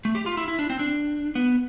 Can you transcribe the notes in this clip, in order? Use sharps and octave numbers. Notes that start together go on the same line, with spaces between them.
A3
G4
F4
E4
E4
D4
C4
D4
B3